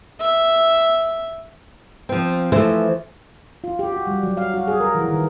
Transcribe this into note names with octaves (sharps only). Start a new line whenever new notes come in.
E5
F3 C4
E3 F3 A3 C5 E5
F4
G4
F#4
G3
F#3
F5
F#4
G#4
A#4
E3
D#3